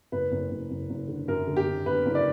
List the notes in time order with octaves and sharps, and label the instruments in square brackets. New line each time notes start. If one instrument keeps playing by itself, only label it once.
[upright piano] F#1 B4
F#1
F#1
F#1
F#1
D3
F#2 A#4
D3
G4
D3
D3 B4
F#1
D5